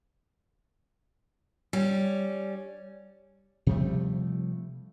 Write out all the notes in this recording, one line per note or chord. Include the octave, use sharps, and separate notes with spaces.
G3 C#4
C3 F3 G3 A3